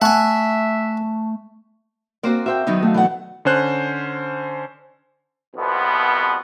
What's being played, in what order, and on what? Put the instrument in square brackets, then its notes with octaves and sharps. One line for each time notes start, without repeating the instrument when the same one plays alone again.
[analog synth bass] A3 [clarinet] E5 [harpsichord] F#5 G#5 [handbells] A5 C#6
[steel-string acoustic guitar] A#3 C4 [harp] F#4 C5 D5
[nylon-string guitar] F#4 C5 [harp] E5 G5
[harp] D#3 F#3 B3 [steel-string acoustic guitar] D#4
[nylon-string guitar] A3 F#4 F5
[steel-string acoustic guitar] E3 A4 F#5
[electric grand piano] D3 C#4 C5 F#6
[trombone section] C2 F2 B2 B3